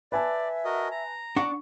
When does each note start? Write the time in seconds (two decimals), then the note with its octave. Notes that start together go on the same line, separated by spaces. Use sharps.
0.12 B4 D5 E5 G#5 A5
0.65 F#4 A#4 D#5
0.91 A#5
1.36 D4 F#5 C#6